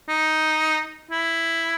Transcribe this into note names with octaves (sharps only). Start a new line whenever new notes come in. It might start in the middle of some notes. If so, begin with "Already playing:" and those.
D#4
E4